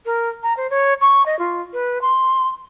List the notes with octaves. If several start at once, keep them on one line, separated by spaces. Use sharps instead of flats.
A#4
A#5
C5
C#5
C#6
D#5
F4
B4
C6